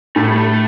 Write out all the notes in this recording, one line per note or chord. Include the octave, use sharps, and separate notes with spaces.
A2 A3
G3
A3